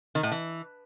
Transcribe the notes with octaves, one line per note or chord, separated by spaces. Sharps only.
D#3
A2
E3